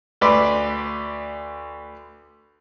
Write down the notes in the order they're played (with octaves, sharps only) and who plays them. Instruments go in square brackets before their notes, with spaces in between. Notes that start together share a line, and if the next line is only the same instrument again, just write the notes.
[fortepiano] D2 B4 D5 C6